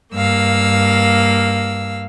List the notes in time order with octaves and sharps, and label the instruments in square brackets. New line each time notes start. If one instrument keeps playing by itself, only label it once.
[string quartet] G2 A#3 F5 E6